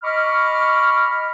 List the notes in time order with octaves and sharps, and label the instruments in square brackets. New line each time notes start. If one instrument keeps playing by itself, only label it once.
[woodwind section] D#5 B5 C#6 D6 F6